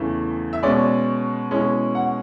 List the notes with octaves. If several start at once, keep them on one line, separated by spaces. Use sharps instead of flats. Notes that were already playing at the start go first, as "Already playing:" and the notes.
Already playing: E2 C#3 E3 A3
E5
B2 G#3 C#4 D5
B2 G#3 C#4 E4
F#5